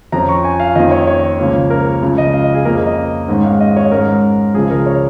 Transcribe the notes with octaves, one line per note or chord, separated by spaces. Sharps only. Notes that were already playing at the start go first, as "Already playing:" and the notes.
F2 F3 C#4 A#5
C#6
G#5
F5
F2 D#3 A#3 C#4 D#5
C#5
C#5
C#2 C#3 F3 A#3 C#4
A#4
A#4
C#2 C#3 F3
D#5
F5
D#5
G#4
F2 C#3 A#3 A#4
A#4
D#5
G#2 D#3 G#3 C#4
F5
D#5
C#5
G#2 G#3 C#4 A#4
C#2 C#3 F3 G#4
A#4
C#5